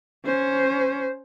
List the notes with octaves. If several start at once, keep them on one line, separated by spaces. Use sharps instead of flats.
C#4 C5